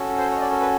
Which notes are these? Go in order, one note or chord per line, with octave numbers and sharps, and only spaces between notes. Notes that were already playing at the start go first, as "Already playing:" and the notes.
Already playing: C#4 F#4 A4
C5
C#5
D#5
D5
A#4
B4